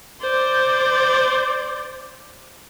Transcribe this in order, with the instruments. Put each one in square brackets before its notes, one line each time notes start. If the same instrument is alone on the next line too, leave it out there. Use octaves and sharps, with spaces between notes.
[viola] C5 D5